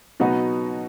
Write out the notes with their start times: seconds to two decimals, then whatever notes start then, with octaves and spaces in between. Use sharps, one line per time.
0.20 B2 F#3 B3 D#4 F#4